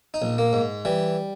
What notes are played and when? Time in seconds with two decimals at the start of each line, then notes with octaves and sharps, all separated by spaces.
0.14 D#4
0.22 A#1
0.38 A#3
0.53 G#2
0.85 E3 G3